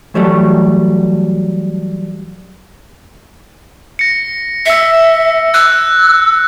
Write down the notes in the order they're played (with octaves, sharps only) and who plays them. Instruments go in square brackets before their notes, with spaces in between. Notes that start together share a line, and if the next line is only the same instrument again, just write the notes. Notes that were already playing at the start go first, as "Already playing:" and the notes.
[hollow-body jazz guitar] E3 F#3 G3 A3
[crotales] A#6 C#7
[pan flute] E5 [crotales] E6 C#7
[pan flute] E6 [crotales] F#6